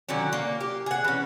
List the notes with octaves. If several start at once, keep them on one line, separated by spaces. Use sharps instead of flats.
D3 D#3 F#3 C#4
A#3
G4
G#4 F#5
E3 C#4